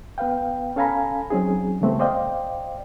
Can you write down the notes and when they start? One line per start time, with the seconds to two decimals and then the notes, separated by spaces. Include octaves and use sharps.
0.18 B3 B4 F5 G5
0.76 C#4 A4 F5 G#5 A#5 B5
1.30 F#3 C4 C#4 D#4 G#4
1.81 C#3 E3 G3 A3 B3 C4
1.99 C5 D5 D#5 F5 G5